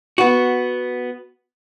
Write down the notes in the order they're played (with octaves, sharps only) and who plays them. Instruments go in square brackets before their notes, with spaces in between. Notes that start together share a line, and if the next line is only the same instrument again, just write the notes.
[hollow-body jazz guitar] B3 F#4